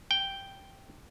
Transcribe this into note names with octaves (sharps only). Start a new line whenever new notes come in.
G5